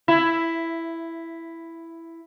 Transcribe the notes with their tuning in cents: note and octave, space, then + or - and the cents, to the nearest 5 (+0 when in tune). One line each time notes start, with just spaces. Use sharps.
E4 +5